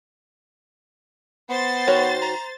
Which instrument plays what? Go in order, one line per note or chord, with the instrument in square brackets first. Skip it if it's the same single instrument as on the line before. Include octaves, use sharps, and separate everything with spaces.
[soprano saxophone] B3 [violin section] C5 A6
[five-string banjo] D#3 F#4 C#5
[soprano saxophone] A#5